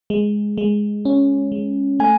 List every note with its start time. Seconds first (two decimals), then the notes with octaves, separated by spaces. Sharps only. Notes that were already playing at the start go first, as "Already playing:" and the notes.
0.10 G#3
0.58 G#3
1.05 C#4
1.52 G#3
2.00 A3 G#5